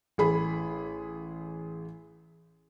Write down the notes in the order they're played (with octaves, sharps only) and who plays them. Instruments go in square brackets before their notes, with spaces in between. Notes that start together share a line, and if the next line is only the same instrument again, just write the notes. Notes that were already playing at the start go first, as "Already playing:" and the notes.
[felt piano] A1 G#4 B5